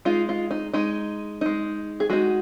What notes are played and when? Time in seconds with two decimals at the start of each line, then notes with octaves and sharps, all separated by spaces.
0.05 G#3 D#4 F4
0.29 F4
0.51 D#4
0.73 G#3 D#4
1.41 G#3 D#4
2.00 G#4
2.10 G#3 D#4 F#4